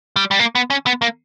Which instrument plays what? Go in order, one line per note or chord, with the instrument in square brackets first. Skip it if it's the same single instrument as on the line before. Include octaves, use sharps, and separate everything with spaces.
[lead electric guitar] G3
G3
A#3
B3
C#4
B3
A#3